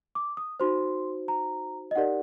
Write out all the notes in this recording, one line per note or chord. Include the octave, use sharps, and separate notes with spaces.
D6
D#6
D#4 F#4 C5 C6
A#5
D#5
D#4 G4 A#4 D5 F#5